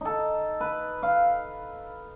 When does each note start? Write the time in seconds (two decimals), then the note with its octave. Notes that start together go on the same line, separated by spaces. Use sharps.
0.01 D#4 A4
0.61 B4
1.03 F5